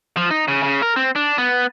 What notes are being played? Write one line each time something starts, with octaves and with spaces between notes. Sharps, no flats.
F3
D#4
C#3
C#3
A#4
C4
D4
B3